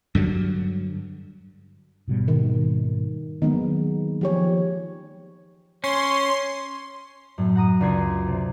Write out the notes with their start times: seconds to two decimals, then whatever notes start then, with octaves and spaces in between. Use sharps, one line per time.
0.15 G2 D3 F#3
2.08 G#2 B2 G3
2.28 D#3
3.42 D#3 F#3 G#3 A#3 B3 D#4
4.21 F3 G4 C#5
5.84 C#4 C#5 C6
7.38 F#2 A2
7.55 F#5 A#5 D#6
7.81 C#2 D4 C6 G#6 C#7
8.28 C3